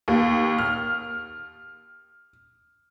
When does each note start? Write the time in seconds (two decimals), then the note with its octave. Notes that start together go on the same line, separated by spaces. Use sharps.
0.08 D#2
0.58 F6